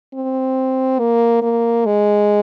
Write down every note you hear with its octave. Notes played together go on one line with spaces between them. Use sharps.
C4
A#3
A#3
G#3